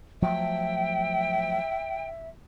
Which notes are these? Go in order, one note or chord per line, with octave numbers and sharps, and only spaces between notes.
F3 F#3 A3 E5 G5